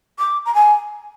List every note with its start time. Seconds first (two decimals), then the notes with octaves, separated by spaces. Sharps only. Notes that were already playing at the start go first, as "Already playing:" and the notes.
0.19 D6
0.46 A#5
0.54 G#5